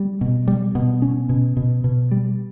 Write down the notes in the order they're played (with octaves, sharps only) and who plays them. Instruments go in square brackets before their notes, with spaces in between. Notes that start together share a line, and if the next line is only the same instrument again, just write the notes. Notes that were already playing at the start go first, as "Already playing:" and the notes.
Already playing: [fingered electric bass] G3
B2
G3
B2
C#4
B2
B2
B2
G3